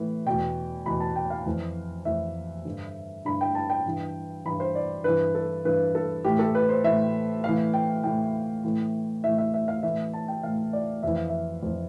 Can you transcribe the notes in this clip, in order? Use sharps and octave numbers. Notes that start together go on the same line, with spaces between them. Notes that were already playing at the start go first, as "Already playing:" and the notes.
Already playing: A2 E3
E2 B2 G5
E2 B2 B5
A5
G5
F5
F2 E3
F2 E3 E5
G2 D3
G2 D3 B5
G5
A5
G5
G2 E3
G2 E3 B5
C5
D5
G2 E3 B4
A4
G2 E3 B4
A4
A2 E3 G4
A4
B4
C5
A2 E3 E5
A2 E3 F5
G5
A2 E3 G5
A2 E3
A2 E3 E5
E5
E5
F5
A2 E3 E5
A5
G5
A2 E3 F5
D5
F2 E3 E5
F5
E5
F2 E3